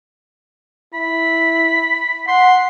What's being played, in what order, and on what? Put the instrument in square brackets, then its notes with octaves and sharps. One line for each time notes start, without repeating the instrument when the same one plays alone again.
[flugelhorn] E4 [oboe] B5
[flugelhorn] F#5 [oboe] C6